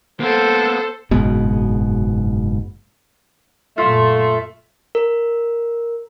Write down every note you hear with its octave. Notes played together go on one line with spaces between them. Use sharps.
A#3 B3 A4 C5
F#1 G#2 B2
F#2 A#2 A3 F4 E5
A#4